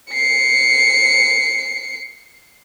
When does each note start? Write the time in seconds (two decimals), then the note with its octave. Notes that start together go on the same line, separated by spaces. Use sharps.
0.11 C7 C#7